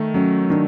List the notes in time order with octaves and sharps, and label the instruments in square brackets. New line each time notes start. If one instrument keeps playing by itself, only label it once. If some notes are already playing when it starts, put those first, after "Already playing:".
Already playing: [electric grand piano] D#3 A3
[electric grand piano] F#3 [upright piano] C#4
[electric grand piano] D#3 [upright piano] D4